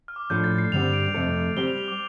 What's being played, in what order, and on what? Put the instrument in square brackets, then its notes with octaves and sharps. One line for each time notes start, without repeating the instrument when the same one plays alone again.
[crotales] F6
D6
[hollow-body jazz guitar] A2 F3 D4 A4 [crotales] G6
[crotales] A6
C7
[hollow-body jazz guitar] G2 D3 G3 C4 G4 [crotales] F7
[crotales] D7
[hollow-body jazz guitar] F2 C3 A3 C4 A4
[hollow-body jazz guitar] G3 C4 G4 [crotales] G7
[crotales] F7
F7
D6